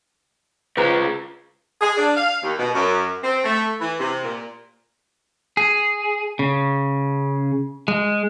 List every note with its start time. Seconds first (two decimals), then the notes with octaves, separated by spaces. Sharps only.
0.77 C#2 G#3 B4 C5 A#5
1.80 G#4
1.98 D4
2.16 F5
2.43 D#2
2.58 B2
2.74 F#2
3.23 C4
3.44 A3
3.80 E3
4.00 C3
4.23 A#2
5.57 G#4
6.39 C#3
7.88 G#3